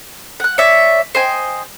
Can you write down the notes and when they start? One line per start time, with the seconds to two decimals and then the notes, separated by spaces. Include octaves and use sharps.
0.40 F#5 F#6
0.58 C#5 D5 E5
1.15 C5 D#5 G5 G#5